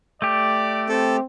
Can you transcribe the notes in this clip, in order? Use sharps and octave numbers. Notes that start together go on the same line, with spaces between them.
A3 G4 D5
C4 A4